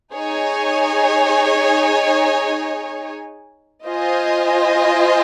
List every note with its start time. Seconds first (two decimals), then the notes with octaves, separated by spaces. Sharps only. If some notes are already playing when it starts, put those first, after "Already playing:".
0.14 D#4 G#4 C#5 G#5
3.86 F4 C5 D#5 G#5